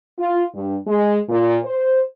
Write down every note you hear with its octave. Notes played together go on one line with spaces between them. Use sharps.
F4
G2
G#3
A#2
C5